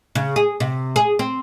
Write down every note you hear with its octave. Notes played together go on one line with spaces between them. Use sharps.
C#3
G#4
C3
G#4
C4